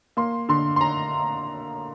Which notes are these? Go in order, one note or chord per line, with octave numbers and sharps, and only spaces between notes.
A#3 C6
D3 C6
C6
A#5